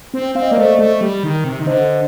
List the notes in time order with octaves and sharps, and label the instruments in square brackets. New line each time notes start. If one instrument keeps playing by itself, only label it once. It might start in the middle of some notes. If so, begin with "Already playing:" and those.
[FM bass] C4
[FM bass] C4 [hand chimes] F5
[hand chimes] D#5
[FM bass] A#3 [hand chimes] D5
[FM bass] A3 [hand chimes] C5 D#5
[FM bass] A3
G3
D#3
C3
D#3
[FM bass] D3 [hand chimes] C5 D#5